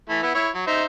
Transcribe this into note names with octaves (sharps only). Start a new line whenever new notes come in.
E3 A3 E4
B3 E4
E4 C#5
F#3
D#4 C5 E5